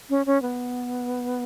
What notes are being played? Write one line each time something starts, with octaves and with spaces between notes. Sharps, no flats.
C#4
C#4
B3